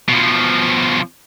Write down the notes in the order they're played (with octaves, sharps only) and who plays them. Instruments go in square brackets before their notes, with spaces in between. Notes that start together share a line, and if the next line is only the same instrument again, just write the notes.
[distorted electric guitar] B2 F3